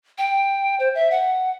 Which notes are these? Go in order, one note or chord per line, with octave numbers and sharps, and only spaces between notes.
G5
C5
E5
F#5